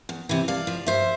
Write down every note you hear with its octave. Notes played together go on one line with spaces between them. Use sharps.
E2
C3 E3
G2 D5 F5
F3
G2 C5 E5